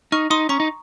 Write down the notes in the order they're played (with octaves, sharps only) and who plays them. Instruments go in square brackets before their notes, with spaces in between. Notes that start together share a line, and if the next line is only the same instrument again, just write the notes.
[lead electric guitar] D#4 [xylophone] C#6 F6
[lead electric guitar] D#4 [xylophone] C6 D#6
[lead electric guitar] C#4 [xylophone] A#5 C#6
[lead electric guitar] D#4